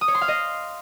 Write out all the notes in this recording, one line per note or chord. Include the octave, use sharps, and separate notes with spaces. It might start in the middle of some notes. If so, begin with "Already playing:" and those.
D#6
C#5
C6
F5
D#5